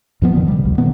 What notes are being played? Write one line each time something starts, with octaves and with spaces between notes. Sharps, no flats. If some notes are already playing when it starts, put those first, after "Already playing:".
F#2 F3 B3
A1 D3 D#3
C3 G3
D2
B2 D3 D#3 B3